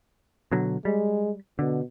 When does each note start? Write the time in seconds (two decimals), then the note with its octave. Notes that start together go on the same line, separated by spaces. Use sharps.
0.51 B2 D3 F#3
0.85 G3 G#3
1.59 B2 D3